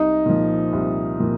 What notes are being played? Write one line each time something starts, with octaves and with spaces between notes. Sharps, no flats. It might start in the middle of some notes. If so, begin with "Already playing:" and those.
Already playing: C2 D#4
A#2 F3
C2
A#2 F3